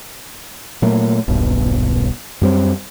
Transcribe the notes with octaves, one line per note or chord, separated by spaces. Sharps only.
A#2 F#3 A3 A#3
D#1 B1 G2 B2
F#2 G3 C4